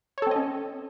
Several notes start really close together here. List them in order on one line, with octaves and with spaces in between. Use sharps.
C#5 A4 C4 D#5 C#4